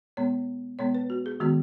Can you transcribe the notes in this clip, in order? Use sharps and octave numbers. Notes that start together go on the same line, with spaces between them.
B2 G#3 B3 C#5
B2 G#3 B3 C#5
B4
F#4
G#4
D#3 G#3 B3 F#4